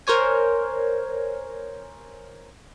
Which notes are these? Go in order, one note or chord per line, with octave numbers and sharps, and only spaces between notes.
A#4 C5 C#5 G#5